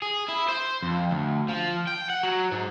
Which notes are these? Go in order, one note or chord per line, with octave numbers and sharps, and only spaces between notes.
G#4
E4
C5
F2
D2
F3
G5
F#5
F#3
G#2